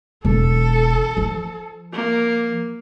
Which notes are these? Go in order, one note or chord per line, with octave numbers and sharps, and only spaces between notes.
E1 A4
F3
A#3